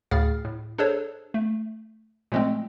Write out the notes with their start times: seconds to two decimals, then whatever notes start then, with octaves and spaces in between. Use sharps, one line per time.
0.11 D2 A2 G#4 F5 F6 A6
0.45 A2
0.78 D4 G#4 A4 C5 C#5
1.34 A3
2.32 A#2 F3 G#3 A3 C4